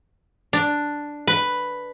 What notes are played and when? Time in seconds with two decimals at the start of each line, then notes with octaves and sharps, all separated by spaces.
0.53 D4
1.27 B4